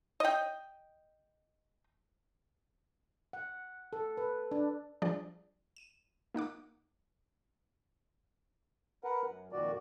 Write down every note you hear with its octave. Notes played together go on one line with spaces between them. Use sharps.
D#5 G5
F#5
A4
B4
D4
F3 G3 D4 G#4 D5
D#7 E7
A#3 D#4 F#5 D6
A#4 B4 F#5
F#2
F2 A#2 D#3 F#4 D5